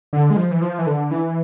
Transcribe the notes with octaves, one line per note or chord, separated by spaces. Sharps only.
D3
G#3
F3
E3
F3
E3
D3
E3